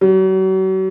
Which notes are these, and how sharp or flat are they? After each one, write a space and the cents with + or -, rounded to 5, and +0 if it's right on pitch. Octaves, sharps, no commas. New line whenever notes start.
F#3 +40